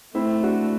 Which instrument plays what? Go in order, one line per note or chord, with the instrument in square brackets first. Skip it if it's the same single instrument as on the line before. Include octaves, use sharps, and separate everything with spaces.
[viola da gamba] A3 [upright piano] C4 E4
[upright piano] D4 F#4